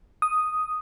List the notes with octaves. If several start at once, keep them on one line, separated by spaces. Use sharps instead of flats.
D#6